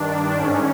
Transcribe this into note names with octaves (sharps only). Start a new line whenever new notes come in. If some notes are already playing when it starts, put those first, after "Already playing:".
Already playing: G2 D#3 D4
G#2 D#3 C#4